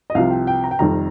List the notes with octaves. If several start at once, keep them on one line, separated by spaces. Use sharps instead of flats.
D#5
C2 C3 F3 F5
G5
G5
A#5
G5
F1 F2 D#3 G3 A#5